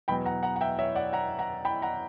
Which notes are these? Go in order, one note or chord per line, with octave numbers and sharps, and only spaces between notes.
E2 B2 F#3 G5 B5
F#5 A#5
F#5 A#5
F#5
E5 G5
C#5 E5
D5 F#5
F#5 A#5
F#5 A#5
G5 B5
F#5 A#5